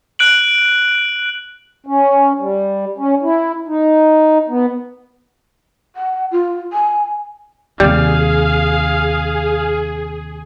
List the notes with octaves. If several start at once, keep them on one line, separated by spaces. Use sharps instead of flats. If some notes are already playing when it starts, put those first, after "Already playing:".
F#6 D7 F#7
C#4
G3
C#4
E4
D#4
B3
F#5
F4
G#5
D#2 C3 G3 G#4 F5